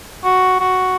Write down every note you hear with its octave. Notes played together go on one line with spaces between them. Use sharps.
F#4
F#4